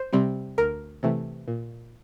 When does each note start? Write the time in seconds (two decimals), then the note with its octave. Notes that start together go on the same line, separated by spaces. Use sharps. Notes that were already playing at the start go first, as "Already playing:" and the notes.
Already playing: C5
0.13 C3 G3 C4
0.58 D2 A#4
1.03 C3 E3 A3
1.48 A#2